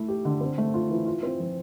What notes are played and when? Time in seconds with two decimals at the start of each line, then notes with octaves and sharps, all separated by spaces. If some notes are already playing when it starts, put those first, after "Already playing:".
Already playing: A3 E4
0.08 G4
0.25 D3
0.41 C4
0.58 A3
0.74 F4
0.90 E3
1.06 F4
1.23 C4
1.40 F3